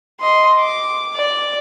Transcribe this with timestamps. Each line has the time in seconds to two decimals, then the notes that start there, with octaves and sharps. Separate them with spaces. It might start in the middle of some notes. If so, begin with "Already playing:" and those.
0.20 D#5 C6
0.59 D6
1.16 D5